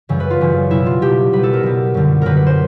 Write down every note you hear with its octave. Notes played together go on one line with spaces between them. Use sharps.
F#2 C#3 E3 G3
B4
F4
F#2 C#3 E3 G3
B2 G3 E4
F4
B2 G3 G4
B2 G3 B4
A4
A#4
B2 G3
F#2 D3 G3
F#2 D3 G3 A#4 B4
B4
C5